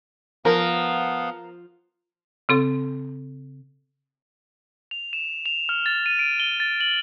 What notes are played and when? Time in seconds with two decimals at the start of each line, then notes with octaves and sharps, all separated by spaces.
0.45 F3 B3 A#4 F5 F#5
2.49 C#3 C4 A4
4.91 F7
5.13 E7
5.46 F7
5.69 F6
5.86 A6
6.06 D#7
6.19 D7
6.40 G7
6.60 A6
6.81 F#7